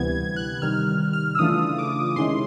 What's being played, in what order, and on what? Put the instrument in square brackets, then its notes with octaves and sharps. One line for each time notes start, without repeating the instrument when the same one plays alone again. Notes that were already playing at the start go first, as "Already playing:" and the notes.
Already playing: [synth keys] D2 C3 E3 G3 B3 G#6
F#6
C3 D#3 G3 F6
F6
E6
C#3 E3 A3 D4 F4 D#6
D6
C3 D#3 G#3 C#4 E4 C6